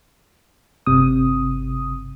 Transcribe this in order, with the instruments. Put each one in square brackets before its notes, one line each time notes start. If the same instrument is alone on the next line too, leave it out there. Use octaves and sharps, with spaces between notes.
[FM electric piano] G1 C3 D#6